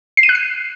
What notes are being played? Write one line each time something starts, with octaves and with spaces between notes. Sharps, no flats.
C7
D#7
F#6
C7